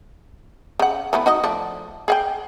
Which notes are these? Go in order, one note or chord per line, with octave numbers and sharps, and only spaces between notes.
C#3 F#5
E3 A3 B3
D#4 F#4 D#5
F3 A3 D4
G#4 F#5 G5